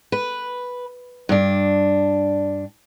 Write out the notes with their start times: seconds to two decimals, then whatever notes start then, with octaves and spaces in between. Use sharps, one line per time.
0.12 B4
1.29 G2 D4